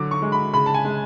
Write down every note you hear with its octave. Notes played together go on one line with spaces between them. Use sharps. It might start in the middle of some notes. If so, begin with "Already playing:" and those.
Already playing: D3 F#3 D6
C#6
G#3
B5
C#3 B5
A5
G#5
G#3